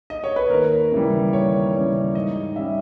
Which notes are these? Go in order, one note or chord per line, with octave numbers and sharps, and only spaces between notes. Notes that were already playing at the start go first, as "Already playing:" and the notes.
D#5
C#5
B4
D#2 A#4
C#3 E3 G3
D#2 C#5
C#3 E3 G3
G#2 D#5
G3 C#4 E5